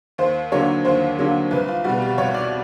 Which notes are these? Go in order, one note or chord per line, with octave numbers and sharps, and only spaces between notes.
D#2 C5
D3 F#3 A#3 C#5
D#2 C5
D3 F#3 A#3
C2 B4
F4
B2 G3 F#4
G4
C2 C#5
D5